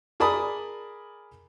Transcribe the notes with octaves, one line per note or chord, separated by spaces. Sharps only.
G#4 A#4 D5 A5 B5 D#6